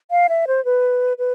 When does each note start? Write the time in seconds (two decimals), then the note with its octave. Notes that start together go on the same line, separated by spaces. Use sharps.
0.11 F5
0.29 E5
0.47 C5
0.65 B4
1.18 B4